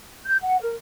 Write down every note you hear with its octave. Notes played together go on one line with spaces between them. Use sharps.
G6
F#5
A#4